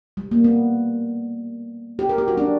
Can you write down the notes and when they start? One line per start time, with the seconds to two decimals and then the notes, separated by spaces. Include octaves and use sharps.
0.17 G3
0.31 A#3
0.44 B3
1.99 G4
2.09 A#4
2.18 G4
2.28 F#4
2.37 D4